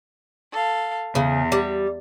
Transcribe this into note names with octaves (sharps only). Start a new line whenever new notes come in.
A4 F5
E2 C#3
G3